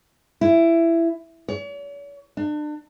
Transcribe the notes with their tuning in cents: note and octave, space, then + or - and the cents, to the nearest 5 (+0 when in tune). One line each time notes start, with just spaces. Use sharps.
E4 +15
C#5 +45
D4 +35